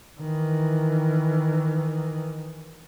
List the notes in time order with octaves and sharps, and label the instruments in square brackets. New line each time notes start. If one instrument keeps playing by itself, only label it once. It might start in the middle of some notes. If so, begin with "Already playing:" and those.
[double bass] D#3 E3